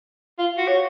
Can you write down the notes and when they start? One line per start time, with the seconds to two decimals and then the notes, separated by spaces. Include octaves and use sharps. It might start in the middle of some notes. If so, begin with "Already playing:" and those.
0.39 F4
0.58 F#4
0.68 C#5